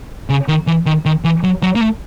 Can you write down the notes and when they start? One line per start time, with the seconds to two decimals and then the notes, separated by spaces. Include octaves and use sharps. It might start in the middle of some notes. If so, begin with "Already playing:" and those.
0.30 C#3
0.48 D#3
0.67 E3
0.86 D#3
1.05 D#3
1.24 E3
1.43 F#3
1.62 F#3
1.75 A#3
1.81 A3